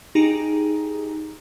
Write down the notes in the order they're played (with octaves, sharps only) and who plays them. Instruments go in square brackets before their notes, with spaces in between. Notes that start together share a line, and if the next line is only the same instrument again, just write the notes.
[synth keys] D#4 G4 G#4 A#5